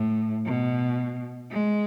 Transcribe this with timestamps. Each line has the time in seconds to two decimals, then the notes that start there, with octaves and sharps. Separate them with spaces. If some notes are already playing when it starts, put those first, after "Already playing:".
Already playing: A2
0.45 B2
1.50 G#3